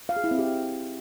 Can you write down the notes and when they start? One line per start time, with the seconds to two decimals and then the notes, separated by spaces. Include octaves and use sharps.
0.09 F5
0.16 G#4
0.24 E4
0.31 C4
0.39 G4